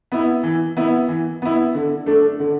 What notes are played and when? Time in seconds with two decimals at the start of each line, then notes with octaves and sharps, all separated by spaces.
0.12 B3 E4
0.43 E3
0.77 B3 E4
1.08 E3
1.42 B3 E4
1.74 D3
2.06 A3 D4
2.40 D3